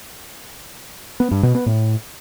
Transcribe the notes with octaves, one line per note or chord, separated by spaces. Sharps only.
B3
G2
B2
B3
A2